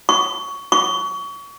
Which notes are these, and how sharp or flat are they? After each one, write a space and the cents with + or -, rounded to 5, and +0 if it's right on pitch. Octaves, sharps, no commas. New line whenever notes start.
C#6 +15
C#6 +30